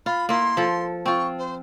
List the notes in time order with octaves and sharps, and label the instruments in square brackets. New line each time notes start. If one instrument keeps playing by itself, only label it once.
[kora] F4 [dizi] B5
[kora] A#3 E4 [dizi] C6
[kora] F3 A4
[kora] C4 F4 [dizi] C#6
[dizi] C5